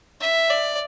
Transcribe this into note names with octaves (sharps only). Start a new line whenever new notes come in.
E5
D5